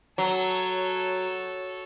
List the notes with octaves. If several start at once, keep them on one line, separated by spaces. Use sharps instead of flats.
F#3 A4 C#5